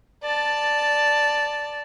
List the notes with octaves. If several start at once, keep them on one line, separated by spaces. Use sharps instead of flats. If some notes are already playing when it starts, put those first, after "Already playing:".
D5 A5